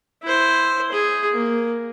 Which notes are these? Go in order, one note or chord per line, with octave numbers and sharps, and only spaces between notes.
E4 C5
G#4
A#3